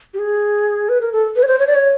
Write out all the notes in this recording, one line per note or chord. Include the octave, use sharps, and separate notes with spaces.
G4
G#4
B4
A#4
A4
B4
C#5
C5
C#5
D5
C#5